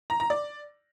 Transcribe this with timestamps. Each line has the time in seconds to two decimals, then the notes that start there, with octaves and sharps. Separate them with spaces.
0.10 A#5
0.20 A#5
0.30 D5